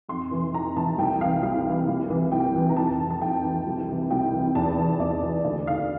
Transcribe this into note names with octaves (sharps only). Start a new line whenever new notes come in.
F2 C6
C3 E3
F2 A#5
C3 E3 A5
C2 G5
C3 E3 F5
C2 F5
C3 E3
C2
C3 E3
C2 G5
C3 E3
A#5
F2 A5
E3
A5
F2 G5
E3
C2
C3 E3
C2 G5
C3 E3
E2 A5
E3
E2 D5
E3
D2 D5
D3 F5